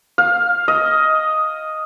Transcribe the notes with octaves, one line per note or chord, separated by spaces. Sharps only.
F5
D#5